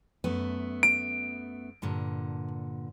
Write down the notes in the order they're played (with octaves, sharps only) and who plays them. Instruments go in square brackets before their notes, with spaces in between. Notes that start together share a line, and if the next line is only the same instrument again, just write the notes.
[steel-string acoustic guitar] F#2 A3 B3
[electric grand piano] D7
[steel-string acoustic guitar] G2 A#2 D3